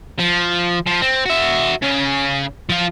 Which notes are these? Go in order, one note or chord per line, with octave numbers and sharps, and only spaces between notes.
F3
F3
C4
F#4 E5
C#3 C#4
F3 F4